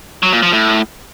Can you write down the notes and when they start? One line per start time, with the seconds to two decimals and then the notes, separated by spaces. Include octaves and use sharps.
0.23 F#3
0.33 A#2
0.43 F3
0.52 A2